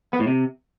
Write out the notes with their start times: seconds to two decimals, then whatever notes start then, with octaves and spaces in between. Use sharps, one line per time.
0.13 B3
0.20 A2
0.27 C3